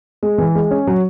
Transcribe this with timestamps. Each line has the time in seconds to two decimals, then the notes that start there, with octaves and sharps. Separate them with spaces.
0.23 G#3
0.38 E3
0.55 G#3
0.71 C#4
0.87 F#3